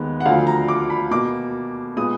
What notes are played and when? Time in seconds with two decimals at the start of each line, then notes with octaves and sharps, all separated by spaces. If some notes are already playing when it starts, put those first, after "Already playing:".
Already playing: D#2 D#3 G#3 B3
0.20 F#5
0.25 D2 D3 F3 F5
0.47 A#5
0.68 D6
0.90 B5
1.11 B2 A#3 D6
1.96 A#2 G#3 B3 D#6